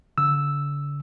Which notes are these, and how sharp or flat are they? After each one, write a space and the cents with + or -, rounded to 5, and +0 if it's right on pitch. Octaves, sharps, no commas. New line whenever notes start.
D3 -45 E6 +0